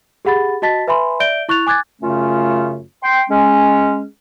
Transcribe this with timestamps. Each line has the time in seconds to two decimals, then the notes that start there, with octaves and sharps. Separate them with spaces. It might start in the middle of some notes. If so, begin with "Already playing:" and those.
0.25 G4 G#4 F#5 B5 A6
0.62 F#4 D#5 A5 A6 B6
0.87 B4 E5 G#5 B5 C6
1.20 D5 E5 G6 D7 G7
1.49 E4 C#6 F#6 A6 F7
1.67 G#5 D6 F#6 G#6 A6
2.02 F#2 C#3 A3 C#4 F4
3.03 G5 C6
3.30 G#3 C#4